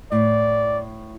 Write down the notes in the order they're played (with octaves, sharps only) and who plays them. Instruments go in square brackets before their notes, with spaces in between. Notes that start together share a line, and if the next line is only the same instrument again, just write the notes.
[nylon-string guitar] A2 [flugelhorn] D5